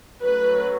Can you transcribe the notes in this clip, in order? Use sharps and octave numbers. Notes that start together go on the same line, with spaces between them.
F#3 A3 C#4 B4